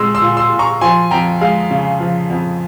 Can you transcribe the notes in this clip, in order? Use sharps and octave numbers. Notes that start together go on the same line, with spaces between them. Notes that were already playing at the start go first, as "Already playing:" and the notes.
Already playing: A#2 G#3 C6 E6
C6 E6
A#2
C6 E6
A#2
A#5 C#6
F3 G#5 C6
F2 G5 A#5
G#3 F5
C#3
F3
F2